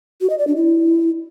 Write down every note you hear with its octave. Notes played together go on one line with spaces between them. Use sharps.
F#4
D#5
D5
D4
E4